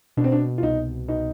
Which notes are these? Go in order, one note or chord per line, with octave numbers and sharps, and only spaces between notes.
B2 D4
C4
D4
F4
C2 D#4
B2 D#4